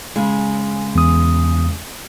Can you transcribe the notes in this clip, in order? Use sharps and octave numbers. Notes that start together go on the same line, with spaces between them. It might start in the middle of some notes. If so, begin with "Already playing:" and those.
C#3 G#3
E2 D#6